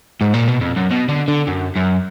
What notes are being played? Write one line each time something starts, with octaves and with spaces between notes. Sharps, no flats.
G#2
A#2
B2
F2
F#2
B2
D3
D3
F#2
F#2